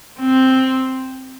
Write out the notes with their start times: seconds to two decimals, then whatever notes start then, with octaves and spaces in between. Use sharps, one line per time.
0.20 C4